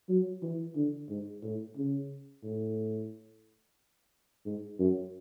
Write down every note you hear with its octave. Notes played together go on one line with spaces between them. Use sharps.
F#3
E3
D3
G#2
A2
C#3
A2
G#2
F#2